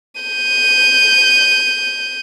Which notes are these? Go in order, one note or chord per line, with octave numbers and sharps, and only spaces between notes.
G6 D#7